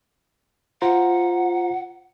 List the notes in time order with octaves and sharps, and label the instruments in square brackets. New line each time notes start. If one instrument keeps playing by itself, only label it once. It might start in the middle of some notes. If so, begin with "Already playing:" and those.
[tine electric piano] F4 C5 A#5 [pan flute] F#5